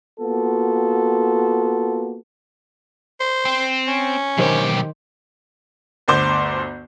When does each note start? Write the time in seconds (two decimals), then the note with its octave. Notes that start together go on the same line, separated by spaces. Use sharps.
0.20 A#3 B3 F4 F#4 A4
3.20 C5
3.45 C4
3.87 C#4
4.38 B1 D#3 G4 C5
6.08 G1 D2 C5 D6 G6